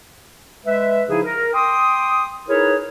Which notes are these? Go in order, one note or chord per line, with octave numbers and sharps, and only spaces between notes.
G#3 B4 E5
C#3 F3 D#4 E4 G#4
A#4
G5 C6 D6 D#6
D#4 E4 G#4 A#4 B4 C#5